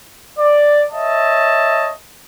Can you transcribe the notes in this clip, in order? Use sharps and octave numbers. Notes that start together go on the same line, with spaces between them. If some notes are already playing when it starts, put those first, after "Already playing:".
D5
C#5 D#5 E5 A5